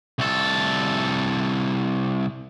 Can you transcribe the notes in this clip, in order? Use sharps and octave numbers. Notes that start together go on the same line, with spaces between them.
C2 A4